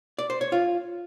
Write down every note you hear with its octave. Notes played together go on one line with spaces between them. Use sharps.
D5
C5
C#5
F4